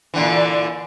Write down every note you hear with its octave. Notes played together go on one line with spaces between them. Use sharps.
A#2 D3 E3